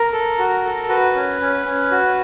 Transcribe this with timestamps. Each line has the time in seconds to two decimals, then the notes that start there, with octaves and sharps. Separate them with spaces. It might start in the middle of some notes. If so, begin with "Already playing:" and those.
Already playing: A#4
0.13 A4
0.39 F#4
0.65 A4
0.89 F#4 B4
1.15 C#4
1.41 C#4
1.66 C#4
1.91 F#4